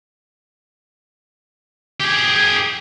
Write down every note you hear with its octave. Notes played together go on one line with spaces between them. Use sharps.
G4 G#4